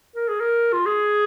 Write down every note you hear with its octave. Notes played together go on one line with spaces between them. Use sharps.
A#4
G#4
A#4
F4
G#4